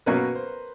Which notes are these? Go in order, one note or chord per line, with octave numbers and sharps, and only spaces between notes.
B2 F#3 A#3 C#4 B4
A#4
C5